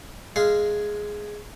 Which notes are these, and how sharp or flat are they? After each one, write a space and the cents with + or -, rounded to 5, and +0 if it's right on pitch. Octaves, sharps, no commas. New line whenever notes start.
G#3 +5 F5 -15